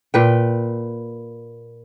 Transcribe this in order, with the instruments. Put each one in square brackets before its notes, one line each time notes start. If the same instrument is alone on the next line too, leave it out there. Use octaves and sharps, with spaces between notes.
[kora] A#2 B4 G5